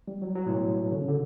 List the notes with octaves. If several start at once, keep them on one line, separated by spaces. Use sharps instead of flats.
G3
F#3
F#3
A2
B2
D3
C#3
D3